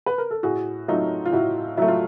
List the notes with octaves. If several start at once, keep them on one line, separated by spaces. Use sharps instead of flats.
B4
A#4
A4
A2 F#4 G#4
F#3 A3 D#4 F4
F4
A2 E4 F#4
F#3 A3 E4
F4